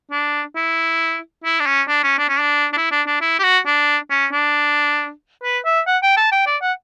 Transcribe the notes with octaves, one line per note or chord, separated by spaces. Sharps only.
D4
E4
E4
D4
C#4
D4
C#4
D4
C#4
D4
D4
E4
D4
D4
E4
G4
F#4
D4
C#4
D4
B4
E5
F#5
G5
A5
G5
D5
F#5